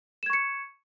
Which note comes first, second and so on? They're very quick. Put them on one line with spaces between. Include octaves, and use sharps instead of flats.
E7 G#6 C#6 C#7